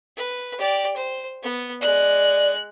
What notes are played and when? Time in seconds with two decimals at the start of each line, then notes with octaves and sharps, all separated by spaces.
0.17 B4
0.58 G4 D5
0.96 C5
1.43 B3
1.81 G#3 D5 F#6